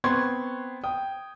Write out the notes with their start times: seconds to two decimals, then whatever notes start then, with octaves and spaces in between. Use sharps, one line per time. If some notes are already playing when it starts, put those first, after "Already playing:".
0.04 B3 C4 C6 C#6 G#6
0.84 G5 D#6